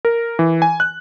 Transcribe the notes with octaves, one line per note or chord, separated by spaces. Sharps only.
A#4
E3
G#5
F#6